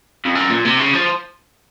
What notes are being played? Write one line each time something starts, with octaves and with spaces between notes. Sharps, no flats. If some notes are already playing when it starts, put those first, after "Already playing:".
F2
F#2
A#2
C3
C#3
F3